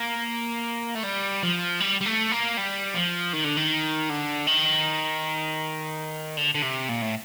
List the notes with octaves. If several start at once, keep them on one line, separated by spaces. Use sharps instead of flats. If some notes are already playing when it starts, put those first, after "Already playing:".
Already playing: A#3
A3
G3
F3
G3
G3
A3
A#3
G3
F3
D#3
D3
D#3
D3
D#3
D3
D3
C3
A#2
A2